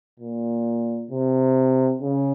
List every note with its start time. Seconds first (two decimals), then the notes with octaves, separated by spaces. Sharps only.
0.20 A#2
1.11 C3
2.01 C#3